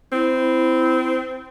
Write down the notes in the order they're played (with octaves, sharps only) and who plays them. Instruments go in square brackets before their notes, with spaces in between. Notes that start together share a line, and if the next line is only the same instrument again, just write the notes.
[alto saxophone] C4 [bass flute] E4